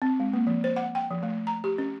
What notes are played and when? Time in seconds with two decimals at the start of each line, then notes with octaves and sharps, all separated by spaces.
0.02 C4
0.20 G#3
0.33 A#3
0.47 F3
0.64 C5
0.76 F#5
0.95 G5
1.10 F3
1.23 A3
1.47 A#5
1.64 G4
1.78 C#4